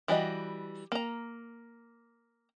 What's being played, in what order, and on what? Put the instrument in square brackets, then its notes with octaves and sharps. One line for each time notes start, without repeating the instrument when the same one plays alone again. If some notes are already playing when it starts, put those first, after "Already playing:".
[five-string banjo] E3 G3 F#4 D#5
A#3 A#5